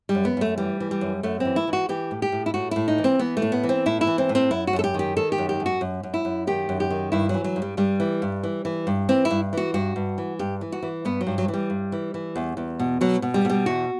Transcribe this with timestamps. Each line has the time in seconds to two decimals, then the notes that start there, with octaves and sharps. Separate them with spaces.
0.09 G3
0.15 F#2
0.25 B3
0.37 F#2 A3
0.58 E3 G3
0.80 E3
0.91 G3
1.01 F#2
1.23 F#2 A3
1.40 E3 C4
1.56 E4
1.68 E3
1.73 F#4
1.89 E3 G4
2.11 A2
2.22 G4
2.32 A2
2.46 E4
2.54 A2 F#4
2.71 A2 E4
2.88 D#4
2.98 E3
3.04 C4
3.19 E3 B3
3.37 A3
3.42 A2
3.52 B3
3.63 E3
3.69 C4
3.86 A2 E4
4.01 E4
4.07 E3
4.18 C4
4.29 A2
4.35 C4
4.51 F#2 E4
4.67 F#4
4.73 F#2
4.79 A4
4.84 G4
4.94 D#3 G4
5.16 D#3 A4
5.32 G4
5.38 F#2
5.49 G4
5.60 F#2
5.66 F#4
5.81 F#2
6.03 F#2
6.14 E4
6.25 F#2
6.47 D#3 G4
6.69 F#2
6.80 G4
6.90 D#3
7.12 G2 E4
7.29 E3 F#3
7.44 F#3
7.56 G2
7.62 G3
7.77 G2 G3
8.00 E3
8.22 G2
8.43 E3
8.65 E3
8.87 G2
9.09 E3 C4
9.25 E4
9.30 G2
9.53 E3 F#4
9.74 G2 F#4
9.96 G2
10.18 E3
10.39 G2 G4
10.61 E3
10.72 F#4
10.82 E3
11.05 G2 B3
11.21 F#3
11.27 G2
11.38 F#3
11.48 E3
11.54 G3
11.70 G2
11.92 E3
12.14 E3
12.36 E2
12.57 E2
12.79 B2
13.01 B2 F#3
13.22 B2
13.34 G3
13.45 B2 G3
13.66 E2 F#4